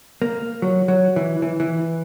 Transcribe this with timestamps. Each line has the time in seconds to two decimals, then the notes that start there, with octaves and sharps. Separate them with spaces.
0.22 A#3
0.62 F#3
0.88 F#3
1.16 E3
1.42 E3
1.60 E3